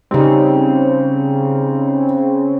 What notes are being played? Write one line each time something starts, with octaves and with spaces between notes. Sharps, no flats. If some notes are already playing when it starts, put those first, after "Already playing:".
C#3 G3 C4 D#4